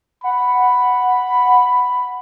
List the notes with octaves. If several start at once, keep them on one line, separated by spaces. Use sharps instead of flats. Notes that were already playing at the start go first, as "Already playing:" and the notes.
F#5 B5